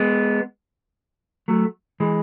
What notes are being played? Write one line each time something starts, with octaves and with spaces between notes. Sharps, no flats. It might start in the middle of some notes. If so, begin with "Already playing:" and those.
Already playing: G#3 B3
F#3 A3
E3 G#3